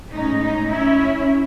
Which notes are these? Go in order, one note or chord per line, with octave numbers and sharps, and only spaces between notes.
A2 G#3 C#4 D#4
D#4
C#4 E4